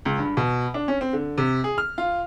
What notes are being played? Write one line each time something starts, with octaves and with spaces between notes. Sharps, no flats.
C#2
G2
B2
D4
C#4
C4
D3
C3
G#4
F6
F4